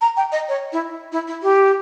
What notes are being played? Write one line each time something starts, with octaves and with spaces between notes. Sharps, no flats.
A#5
G5
D#5
C#5
E4
E4
E4
G4